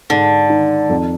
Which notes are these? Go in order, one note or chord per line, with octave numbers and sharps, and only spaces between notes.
G#2 D3
D#3
F2